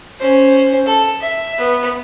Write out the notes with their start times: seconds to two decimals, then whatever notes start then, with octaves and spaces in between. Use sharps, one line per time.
0.19 C#4 C5
0.86 A4
1.21 E5
1.58 B3